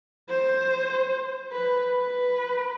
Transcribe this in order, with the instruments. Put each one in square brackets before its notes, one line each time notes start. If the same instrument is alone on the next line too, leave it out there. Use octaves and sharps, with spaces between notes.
[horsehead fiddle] C5
B4
B4